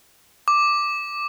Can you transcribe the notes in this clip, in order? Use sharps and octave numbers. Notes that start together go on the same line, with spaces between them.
D6